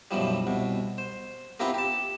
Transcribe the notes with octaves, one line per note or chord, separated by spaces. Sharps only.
F#2 B2 E3 F3 G3
C2 B2
C5
B3 C4 E4 F4 G4 A#4
G4 A5